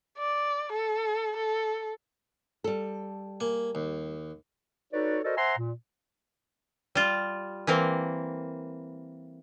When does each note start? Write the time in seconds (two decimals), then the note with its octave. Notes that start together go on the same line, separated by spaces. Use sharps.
0.18 D5
0.72 A4
1.36 A4
2.64 G3 A4
3.40 A#3 G#5
3.75 D#2
4.92 D#4 F#4 A4 B4 C#5 D5
5.23 F#4 A4 A#4 C5 D5 D#5
5.36 C5 E5 F#5 G#5 A#5 C6
5.57 A#2
6.95 G3 F4
7.67 E3 A#3 C4